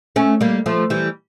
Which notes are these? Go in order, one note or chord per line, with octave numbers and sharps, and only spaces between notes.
A3 C#4
G3 A#3
F3 A3
E3 G3